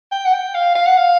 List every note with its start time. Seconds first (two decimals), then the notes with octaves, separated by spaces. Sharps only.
0.11 G5
0.25 F#5
0.33 G5
0.55 F5
0.75 F5
0.86 F#5
0.97 F5